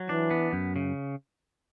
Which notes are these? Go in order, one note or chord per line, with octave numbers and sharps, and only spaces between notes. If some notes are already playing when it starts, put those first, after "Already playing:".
Already playing: F#3
E3 D4
B3
F#2
C#3